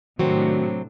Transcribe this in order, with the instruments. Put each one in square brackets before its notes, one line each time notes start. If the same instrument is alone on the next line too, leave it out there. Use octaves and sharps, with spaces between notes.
[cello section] A2 C3 D4 [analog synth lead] D#3 [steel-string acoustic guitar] F#3 C4 [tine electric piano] F#4